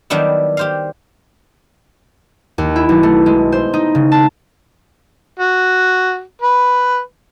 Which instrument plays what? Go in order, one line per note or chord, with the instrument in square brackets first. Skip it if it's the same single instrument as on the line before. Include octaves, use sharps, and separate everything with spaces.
[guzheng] D#3 F#3 G3 B3 D4 E4
G4 C5 F5
[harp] D#2
E4
B1
A3
G#3
C5
D#4
C#3
A5
[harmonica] F#4
B4